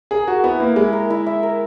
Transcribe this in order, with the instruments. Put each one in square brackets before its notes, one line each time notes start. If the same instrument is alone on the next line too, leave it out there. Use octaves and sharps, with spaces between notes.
[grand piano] G#4 [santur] A#4
[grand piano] F#4 [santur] A#4
[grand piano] B3 [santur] E4
[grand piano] A#3 [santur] E4
[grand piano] G#3 [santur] E4
[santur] A#4
E4
E5
A#4